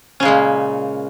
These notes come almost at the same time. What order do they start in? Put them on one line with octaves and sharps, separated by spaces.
C#4 C#3 G#3 A#2